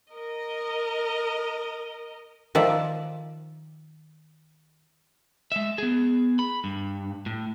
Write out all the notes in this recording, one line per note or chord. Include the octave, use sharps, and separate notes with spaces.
A#4 D#5
D#3 F3 D5 E5
G#3 E5
B3 G#4
B5
G2
A2